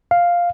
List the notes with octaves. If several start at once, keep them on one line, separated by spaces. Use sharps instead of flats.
F5